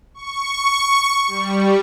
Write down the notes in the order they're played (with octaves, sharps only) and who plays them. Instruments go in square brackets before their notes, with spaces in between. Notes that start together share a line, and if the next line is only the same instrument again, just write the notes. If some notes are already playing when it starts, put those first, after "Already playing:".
[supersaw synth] C#6
G3